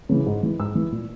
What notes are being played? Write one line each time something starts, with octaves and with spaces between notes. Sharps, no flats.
C#3 E3
G#2
E3
G#2 E6
E3
A#2